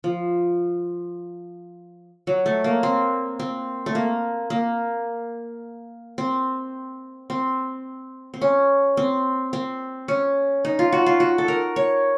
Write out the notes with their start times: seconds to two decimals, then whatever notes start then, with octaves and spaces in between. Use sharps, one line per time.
0.04 F3
2.27 F#3
2.46 A3
2.64 A#3
2.83 C4
3.39 C4
3.86 A3
3.95 A#3
4.50 A#3
6.18 C4
7.30 C4
8.34 C4
8.41 C#4
8.97 C4
9.53 C4
10.08 C#4
10.65 D#4
10.79 F4
10.92 F#4
11.06 F4
11.20 F#4
11.38 A4
11.48 A#4
11.76 C#5